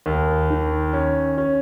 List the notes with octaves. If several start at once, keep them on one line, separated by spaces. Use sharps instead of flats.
D#2
D#3
C#4
C#4